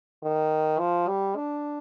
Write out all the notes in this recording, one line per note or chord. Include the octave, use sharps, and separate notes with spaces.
D#3
F3
G3
D4